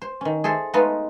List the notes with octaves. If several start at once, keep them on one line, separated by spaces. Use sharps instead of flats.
C5
D#3 C#4
G#4 A4 C5 E5
G#3 A3 B3 D#4 F4 B4